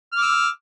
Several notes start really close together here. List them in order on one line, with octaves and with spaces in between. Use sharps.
F6 D6 E6